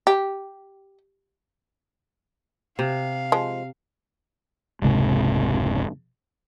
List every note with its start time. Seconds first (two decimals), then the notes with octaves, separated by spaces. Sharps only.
0.07 G4
2.79 C3 F5
3.32 F3 G#3
4.82 F1 C#2 G#2 C3